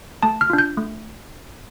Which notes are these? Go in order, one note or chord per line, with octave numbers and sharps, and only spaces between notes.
A3 A5
F6
D4 F4
G6
A3